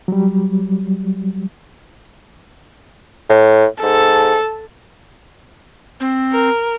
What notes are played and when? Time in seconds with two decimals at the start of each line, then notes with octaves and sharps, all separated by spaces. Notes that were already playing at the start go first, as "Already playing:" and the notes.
0.08 F#3 G3
3.29 A2
3.83 G#2 A4
6.00 C4
6.32 A#4